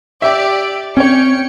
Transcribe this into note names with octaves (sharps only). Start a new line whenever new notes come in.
G4 D5 E5
C4 C#4 C#5 G5 C#7